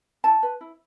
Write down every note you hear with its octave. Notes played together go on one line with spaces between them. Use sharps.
E4 A5
B4
E4